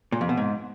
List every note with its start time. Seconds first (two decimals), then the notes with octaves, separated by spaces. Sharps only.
0.12 A#2
0.21 F2
0.29 B2
0.37 G#2